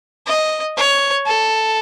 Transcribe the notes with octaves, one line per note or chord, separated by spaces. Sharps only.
D#5
C#5
A4